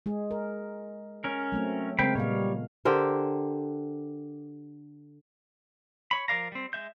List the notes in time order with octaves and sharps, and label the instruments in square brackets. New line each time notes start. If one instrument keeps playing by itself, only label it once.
[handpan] G#3 G#4
A#4
[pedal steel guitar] C#4 A#4
[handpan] F#3 A3 C4
[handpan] C#3 G#3 A#4 [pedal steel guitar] C4 G5 B5
[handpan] A#2 B3 F5 [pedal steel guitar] G3 C#5
[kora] D3 G4 A#4 C5
[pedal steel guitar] C#5 B5
F3 A#4 D5 F5 A#5
G3 C4
G#3 E5 G6